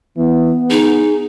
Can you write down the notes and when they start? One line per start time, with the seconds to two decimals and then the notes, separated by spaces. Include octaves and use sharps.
0.17 E3 B3
0.70 D#4 G#4